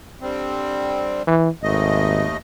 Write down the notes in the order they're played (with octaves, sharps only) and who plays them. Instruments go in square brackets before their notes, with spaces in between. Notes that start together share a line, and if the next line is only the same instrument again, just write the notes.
[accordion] D3 G3 C4
[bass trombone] E3
[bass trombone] G#1 [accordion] D#2 A3 D#5